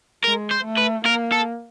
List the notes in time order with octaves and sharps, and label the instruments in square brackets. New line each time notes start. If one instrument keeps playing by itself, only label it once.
[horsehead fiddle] G#3 [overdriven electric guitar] A#4
[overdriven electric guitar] C5
[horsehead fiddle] A3
[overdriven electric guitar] B4
[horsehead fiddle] A#3 [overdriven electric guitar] A#4
[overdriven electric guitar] A4